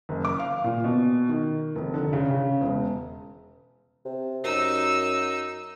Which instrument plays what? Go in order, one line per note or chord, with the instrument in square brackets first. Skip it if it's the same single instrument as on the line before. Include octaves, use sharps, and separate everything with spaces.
[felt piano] F#1
D6
F5
A#2
B2
D#3
F1
D3
C#3
C#3
E1
[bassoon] C3
[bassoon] F#2 [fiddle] D#4 E6